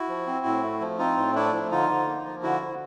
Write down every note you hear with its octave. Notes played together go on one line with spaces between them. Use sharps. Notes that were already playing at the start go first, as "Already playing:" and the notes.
Already playing: E4 F#4
F3
C4
A2
A3
F3
C4 D#4 F4
A2
A3 D4 E4
F3
D3 D#4 F4
D3
A#3
F3
D3 E4 F#4
D3